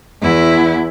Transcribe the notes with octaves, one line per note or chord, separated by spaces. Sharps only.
E2 E4